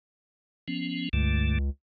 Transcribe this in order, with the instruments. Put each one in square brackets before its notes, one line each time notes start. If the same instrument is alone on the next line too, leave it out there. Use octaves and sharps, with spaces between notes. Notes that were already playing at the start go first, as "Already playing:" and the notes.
[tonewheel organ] F3 B3 C#4
[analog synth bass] C#2 [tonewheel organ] G2 D3 A3